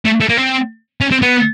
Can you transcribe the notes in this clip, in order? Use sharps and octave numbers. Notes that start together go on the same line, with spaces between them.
A3
A3
A#3
C4
C#4
C4
B3